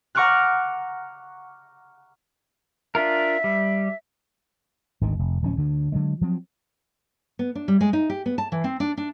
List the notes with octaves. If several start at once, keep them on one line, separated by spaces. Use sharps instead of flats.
F#5 A#5 C#6 D6 F6 F#6
D4 F4 A#4 E5
G3
G#1 D2 D#3
F1
D1 F3 C#4
D2 D3
D3 F#3 G#3
F3 F#3 C4
B3
D4
G3
G#3
D#4
G4
B3
A5
E3
C4
D4
D4